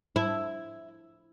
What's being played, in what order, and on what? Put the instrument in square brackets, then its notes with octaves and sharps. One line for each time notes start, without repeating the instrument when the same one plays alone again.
[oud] E4